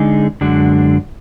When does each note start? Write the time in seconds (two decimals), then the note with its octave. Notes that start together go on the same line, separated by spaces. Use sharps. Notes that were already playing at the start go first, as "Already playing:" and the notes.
Already playing: D3 G#3 D#4 G#4
0.41 F#2 D3 G#3 D4 F#4